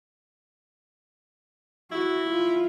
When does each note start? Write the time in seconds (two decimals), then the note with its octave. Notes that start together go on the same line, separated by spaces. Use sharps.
1.92 E4 F#4
2.30 F4